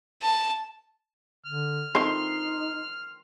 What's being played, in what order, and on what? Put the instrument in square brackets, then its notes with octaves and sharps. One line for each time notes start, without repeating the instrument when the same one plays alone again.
[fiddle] A5
[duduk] D3 [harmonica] F6
[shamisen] D#3 C4 A4 [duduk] D#4 [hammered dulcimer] C6